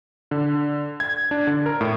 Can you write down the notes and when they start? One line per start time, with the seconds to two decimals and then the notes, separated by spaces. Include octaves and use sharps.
0.31 D3
1.00 G#6
1.31 D4
1.47 D3
1.66 A#4
1.81 A2